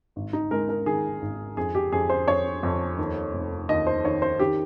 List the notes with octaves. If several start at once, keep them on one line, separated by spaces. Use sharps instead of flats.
G#1
D#4
G#3 A#4
A#4
D#3 G#4
G#1
F2 G#4
G4
F2 G#4
C5
F2 C#5
F2
D#2
F1
D#2 D#5
C5
D#3 C#5
C5
D#3 G4